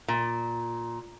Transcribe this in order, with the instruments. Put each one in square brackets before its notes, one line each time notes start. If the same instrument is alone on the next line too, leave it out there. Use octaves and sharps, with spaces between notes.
[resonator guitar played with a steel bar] A#2